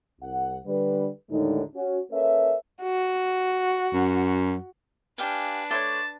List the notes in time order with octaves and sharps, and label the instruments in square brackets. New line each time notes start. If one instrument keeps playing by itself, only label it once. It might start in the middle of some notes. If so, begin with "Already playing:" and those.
[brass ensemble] C2 F#5
D3 G3 B4
D#2 A2 D3 G#3 D#4
C#4 F#4
A#3 C#4 A4 B4 E5
[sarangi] F#4
[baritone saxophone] F#2
[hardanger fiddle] D4 B4 [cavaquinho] G4 F5 G#5
[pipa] A3 C#5 [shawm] A5 [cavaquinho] C6 D6